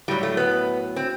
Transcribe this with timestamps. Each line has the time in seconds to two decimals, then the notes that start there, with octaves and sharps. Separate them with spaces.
0.08 A2 F#3 G3
0.23 A3
0.37 B3
0.96 C4